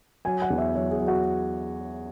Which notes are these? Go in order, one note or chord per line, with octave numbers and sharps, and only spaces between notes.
F#3 G#5
F#5
E2
E5
F#3 C#5
G#4
F#3
F#4